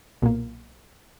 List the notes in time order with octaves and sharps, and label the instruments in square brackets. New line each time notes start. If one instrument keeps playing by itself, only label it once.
[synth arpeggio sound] B1 A#2 A#3